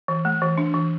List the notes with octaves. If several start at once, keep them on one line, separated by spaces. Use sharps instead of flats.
E3
A3
E3
D4
E3